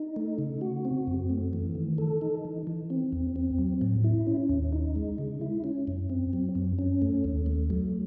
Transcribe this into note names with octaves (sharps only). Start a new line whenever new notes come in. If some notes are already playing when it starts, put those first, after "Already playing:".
Already playing: D#4
A3
C#3
F#4
C4
F#2
A3
E3
D#3
A4
D#4
E3
E3
C4
E2
C4
F#3
A2
E4
C#4
D#2
D#4
G#3
C#3
E4
C#4
F#2
C4
F#3
F#2
C#4
A3
D#2
A3
F#3